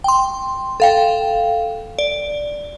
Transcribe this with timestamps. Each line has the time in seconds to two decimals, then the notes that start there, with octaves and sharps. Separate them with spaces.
0.04 G5 C6
0.80 A4 F5 G5
1.99 D5